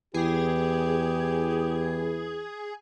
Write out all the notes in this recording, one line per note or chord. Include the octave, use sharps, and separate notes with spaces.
E2 E3 G4 G#4